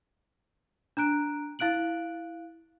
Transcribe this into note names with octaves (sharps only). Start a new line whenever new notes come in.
D4 A#5 F#6 D7
E4 F5 F#6 D7 F#7